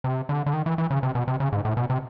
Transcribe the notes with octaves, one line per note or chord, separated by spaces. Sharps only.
C3
D3
D3
D#3
E3
E3
C#3
C3
B2
C3
C#3
G#2
A2
B2
C3